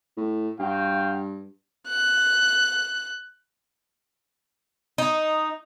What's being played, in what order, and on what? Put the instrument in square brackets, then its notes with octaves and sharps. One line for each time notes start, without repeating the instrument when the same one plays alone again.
[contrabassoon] A2
[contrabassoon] G2 [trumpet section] F#4 F5 G5
[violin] F#6
[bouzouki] D#4